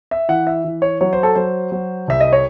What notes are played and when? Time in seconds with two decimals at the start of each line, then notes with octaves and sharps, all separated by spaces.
0.11 E5
0.29 E3 F#5
0.47 E5
0.65 E3
0.82 C#5
1.01 F#3 C#5
1.13 C5
1.23 A4
1.35 F#3 C5
1.72 F#3
2.08 C2 E5
2.20 D#5
2.33 C#5